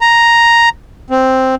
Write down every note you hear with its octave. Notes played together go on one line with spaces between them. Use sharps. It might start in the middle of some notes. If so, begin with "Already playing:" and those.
A#5
C4